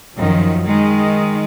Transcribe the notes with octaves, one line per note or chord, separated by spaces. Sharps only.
F#2 D#3 F3
D#3 G#3